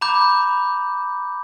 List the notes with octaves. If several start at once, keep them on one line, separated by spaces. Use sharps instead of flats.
A#5 B5 D6 G6